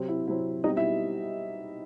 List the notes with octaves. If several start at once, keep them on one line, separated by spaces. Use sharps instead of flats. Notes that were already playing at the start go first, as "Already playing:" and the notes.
Already playing: C3 F#3 C4
E4
C3 F#3 C4 E4
B2 G3 C4 D#4 D#5
E4 E5